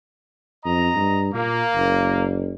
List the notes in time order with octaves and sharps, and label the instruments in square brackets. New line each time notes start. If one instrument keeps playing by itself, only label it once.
[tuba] F2 [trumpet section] D#5 A#5
[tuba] G2
[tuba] A#2 [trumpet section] A#3
[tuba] F#1